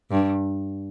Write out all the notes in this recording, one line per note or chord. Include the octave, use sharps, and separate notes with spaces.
G2